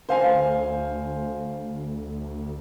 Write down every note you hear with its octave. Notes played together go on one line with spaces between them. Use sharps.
D2 C5 F5 G#5